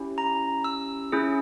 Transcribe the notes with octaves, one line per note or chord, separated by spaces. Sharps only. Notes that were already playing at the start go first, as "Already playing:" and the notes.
Already playing: C#4 E4 G4
A#5
E6
C#4 E4 G#4